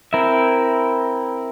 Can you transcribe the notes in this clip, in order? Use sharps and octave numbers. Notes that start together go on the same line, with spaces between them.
C4 E4 A#4 E5